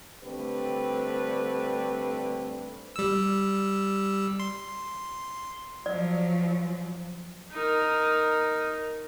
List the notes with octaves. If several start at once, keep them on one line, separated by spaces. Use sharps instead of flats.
D3 G3 A3 C4 B4
G3 E6
C6
F3 F#3 D5
D#4 A#4